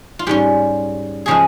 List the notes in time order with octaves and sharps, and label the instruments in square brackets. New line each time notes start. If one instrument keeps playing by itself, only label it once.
[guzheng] F4
G#2 G3 C#4 G4
C#3 F3 G#3 G#4